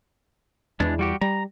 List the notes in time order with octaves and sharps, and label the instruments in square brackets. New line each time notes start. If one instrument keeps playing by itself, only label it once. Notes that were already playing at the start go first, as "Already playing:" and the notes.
[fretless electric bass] E2 E3 [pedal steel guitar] G#3 D4
[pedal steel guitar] G3 F#4 G4
[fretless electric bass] G3 [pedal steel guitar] A#5